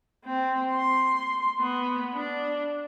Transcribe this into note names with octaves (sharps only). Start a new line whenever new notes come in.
C4
C6
B3
D4